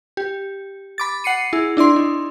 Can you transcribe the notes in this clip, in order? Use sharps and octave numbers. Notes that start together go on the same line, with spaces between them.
G4
B5 D6 A6
F#5 C7 C#7 D#7
E4 G#4
D4 E4 D5 C6
D#4